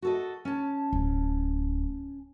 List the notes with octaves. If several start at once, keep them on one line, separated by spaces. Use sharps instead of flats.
F#4 A4 D#5
C#4 A5
D1